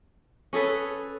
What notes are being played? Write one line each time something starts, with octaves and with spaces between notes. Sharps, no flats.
C#4 G#4 A4 B4